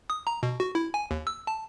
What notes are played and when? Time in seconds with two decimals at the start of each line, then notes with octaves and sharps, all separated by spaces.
0.10 D#6
0.27 A#5
0.43 B2
0.60 F#4
0.75 E4
0.94 G#5
1.11 D#2
1.27 E6
1.47 A5